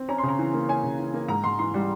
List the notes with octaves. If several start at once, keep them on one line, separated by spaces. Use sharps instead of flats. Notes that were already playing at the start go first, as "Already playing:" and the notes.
Already playing: C4
C#4 A#5
C#3 C6
A#5
E3
A#3
C#4 G#5
C#3
E3
A#3
G#2 A#5
G#2 C6
E3 C6
G3